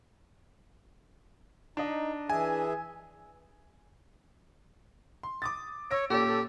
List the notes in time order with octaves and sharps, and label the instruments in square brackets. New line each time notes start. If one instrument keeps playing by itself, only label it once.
[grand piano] D4 D#5 [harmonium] D#4
[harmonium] E3 G#4 E5 [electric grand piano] G#5
[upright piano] C6
D6 D#6 A6
[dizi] C#5 [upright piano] E6 A#6 D7
[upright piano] A#2 C#4 [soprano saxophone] G4 [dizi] A4
[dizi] A4